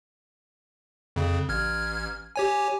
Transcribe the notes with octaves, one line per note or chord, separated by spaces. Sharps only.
F2 C#3
A1 F6 G#6
G4 C#5 G#5